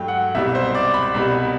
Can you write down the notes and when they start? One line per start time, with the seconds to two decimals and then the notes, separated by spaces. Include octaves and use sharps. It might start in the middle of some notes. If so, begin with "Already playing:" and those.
Already playing: G2 F#3 A3 G5
0.08 F#5
0.35 C2 B2 G3 E5
0.55 C5
0.74 D5
0.94 B5
1.14 C2 B2 G3